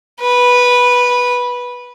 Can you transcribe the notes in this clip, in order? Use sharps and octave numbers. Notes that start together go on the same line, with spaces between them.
B4